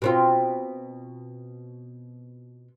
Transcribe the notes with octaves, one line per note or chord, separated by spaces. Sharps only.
B2 C4 F4